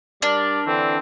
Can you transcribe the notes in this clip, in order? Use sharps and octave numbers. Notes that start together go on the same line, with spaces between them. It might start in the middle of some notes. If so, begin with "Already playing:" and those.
G3 D4 A#4 D5
D3 E3 C4